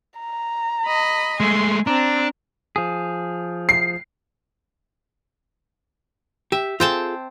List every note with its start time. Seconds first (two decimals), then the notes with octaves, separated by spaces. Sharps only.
0.20 A#5
0.86 D#5 B5
1.40 G#3 A3 G#5 C6
1.87 C4 D4 A#5
2.76 F3 G#4
3.69 C7
6.52 G4 E5
6.80 C4 F4 G#4 A4 G5 A5